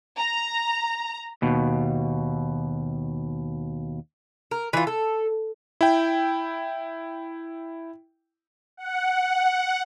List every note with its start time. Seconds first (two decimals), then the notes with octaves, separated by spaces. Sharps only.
0.18 A#5
1.42 D#2 B2
4.51 A#4
4.73 E3 F4
4.87 A4
5.81 E4 G5
8.77 F#5